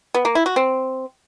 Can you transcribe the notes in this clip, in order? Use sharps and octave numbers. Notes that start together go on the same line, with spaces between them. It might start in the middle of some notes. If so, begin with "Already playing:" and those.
B3
A#3
E4
F#4
C4